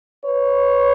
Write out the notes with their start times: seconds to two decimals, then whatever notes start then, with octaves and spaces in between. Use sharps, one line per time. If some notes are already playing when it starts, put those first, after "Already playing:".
0.22 B4 C#5